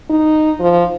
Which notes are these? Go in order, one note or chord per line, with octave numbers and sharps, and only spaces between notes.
D#4
F3